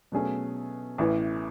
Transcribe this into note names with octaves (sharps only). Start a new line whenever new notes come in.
B2 F#3 A3 C#4 G#4
A1 A2 E3